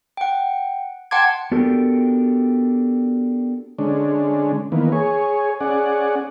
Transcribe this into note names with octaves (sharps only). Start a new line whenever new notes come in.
F#5 G5
F#5 G5 A5 C6 D6 G#6
B3 D4 F#4 G4 A4 A#4
D3 G#3 C#4 D4
D#3 E3 A#3 B3
G#4 C#5
C#4 G#4 D5 F#5